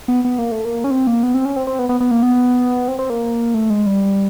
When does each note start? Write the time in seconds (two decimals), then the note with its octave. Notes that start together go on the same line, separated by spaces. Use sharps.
0.08 B3
0.25 B3
0.38 A#3
0.52 A3
0.65 A#3
0.84 C#4
0.91 C4
1.07 A#3
1.23 B3
1.34 C4
1.45 C#4
1.56 C4
1.67 C4
1.79 B3
1.89 B3
2.00 B3
2.11 A#3
2.23 B3
2.88 C4
2.99 C4
3.10 A#3
3.54 A3
3.70 G#3
3.86 G3